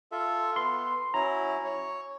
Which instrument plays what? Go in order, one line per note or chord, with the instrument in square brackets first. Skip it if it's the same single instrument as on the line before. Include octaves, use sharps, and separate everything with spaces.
[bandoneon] F4 A4 E5
[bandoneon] B3 [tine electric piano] C6
[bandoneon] F#3 C#4 E4 [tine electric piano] A#5
[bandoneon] C#5